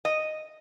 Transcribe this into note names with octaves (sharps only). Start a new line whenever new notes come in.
D#5